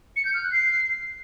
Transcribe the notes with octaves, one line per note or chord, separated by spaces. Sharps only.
C#7
G6
F6
F#6
C7